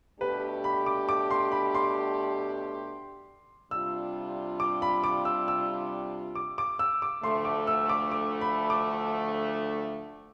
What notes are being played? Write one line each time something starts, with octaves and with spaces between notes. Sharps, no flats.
B2 A3 D4 G4 B4
B5
D6
D6
C6
B5
C6
C3 G3 D4 F4 E6
D6
B5
D6
E6
E6
D6
D6
E6
D6
D2 D3 F3 A3 C6
D6
E6
D6
D6
B5
D6